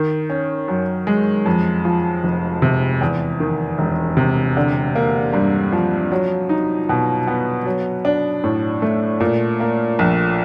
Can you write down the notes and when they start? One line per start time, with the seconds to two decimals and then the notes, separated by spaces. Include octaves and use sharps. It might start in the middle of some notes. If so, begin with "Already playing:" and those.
Already playing: D#3
0.30 C#4
0.68 F#2
1.07 G#3
1.46 F2
1.85 F3
2.23 F1
2.62 C3
3.01 E2
3.40 D#3
3.78 E1
4.17 C3
4.57 D3
4.95 A#3
5.33 G2
5.73 F3
6.12 F#3
6.49 D#4
6.89 B2
7.27 B3
7.66 F#3
8.05 D4
8.44 A2
8.82 A3
9.20 A#2
9.60 A#3
9.99 A#1